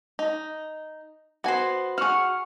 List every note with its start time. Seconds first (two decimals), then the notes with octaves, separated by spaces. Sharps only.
0.19 D#4
1.44 B3 F#4 C5 G#5
1.98 F#4 G#4 F#5 C#6 F6